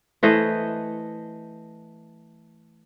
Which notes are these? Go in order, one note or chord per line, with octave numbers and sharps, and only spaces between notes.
E3 A3 C5 D#5